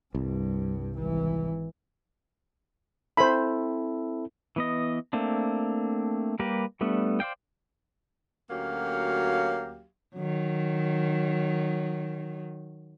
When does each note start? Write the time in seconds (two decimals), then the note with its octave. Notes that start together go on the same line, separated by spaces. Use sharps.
0.15 C2 G2
0.95 G#1 E3
3.17 C4 E4 A4 C5 B5
4.56 E3 B3 D#5
5.13 A3 A#3 C4 D4
6.39 G3 A#3 G4 A#4 B4
6.81 G3 A3 B3 D4
7.20 C5 D5 F5 G5
8.51 D2 F#3 A#3 C#4 G4 F5
10.16 D#3 F#3